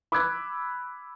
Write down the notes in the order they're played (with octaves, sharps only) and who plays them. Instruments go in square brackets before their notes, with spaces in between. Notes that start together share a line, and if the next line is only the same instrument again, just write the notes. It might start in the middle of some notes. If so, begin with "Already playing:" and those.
[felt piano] B5 D6 E6 F#6 G#6